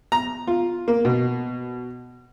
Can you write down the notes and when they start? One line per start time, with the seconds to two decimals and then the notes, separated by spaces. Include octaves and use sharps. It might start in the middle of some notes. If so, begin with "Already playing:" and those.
0.12 A#5
0.47 F4
0.88 A#3
1.05 B2